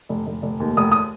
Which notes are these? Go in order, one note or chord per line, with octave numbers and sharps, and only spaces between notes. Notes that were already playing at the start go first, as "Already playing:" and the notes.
F1
F1
F1
D#2
F1 D#6
D#6